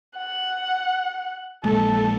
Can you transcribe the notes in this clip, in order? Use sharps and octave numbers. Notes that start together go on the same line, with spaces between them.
F#5
A#1 G#3 A#3 A4